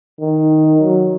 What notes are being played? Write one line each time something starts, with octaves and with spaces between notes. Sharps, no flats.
D#3
F#3